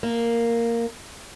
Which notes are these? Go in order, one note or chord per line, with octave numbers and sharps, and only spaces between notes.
A#3